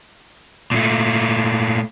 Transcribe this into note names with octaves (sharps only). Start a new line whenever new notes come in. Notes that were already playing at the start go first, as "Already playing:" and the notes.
A#2 A3